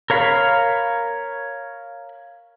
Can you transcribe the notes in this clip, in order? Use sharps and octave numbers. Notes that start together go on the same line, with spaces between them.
A#4 C#5 F5 B5